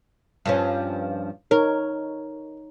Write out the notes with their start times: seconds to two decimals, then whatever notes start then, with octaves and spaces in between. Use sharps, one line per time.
0.46 G2 F3 C#4
1.51 D#4 A#4 C#5